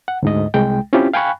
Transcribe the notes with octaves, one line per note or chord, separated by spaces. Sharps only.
F#5
D2 G#2 D#5
C2 G#3 G5
C4 C#4 E4 F4 G4
F5 G5 G#5 B5 C#6 F#6